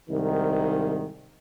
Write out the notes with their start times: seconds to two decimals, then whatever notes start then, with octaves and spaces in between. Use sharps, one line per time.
0.10 C2 G#2 D#3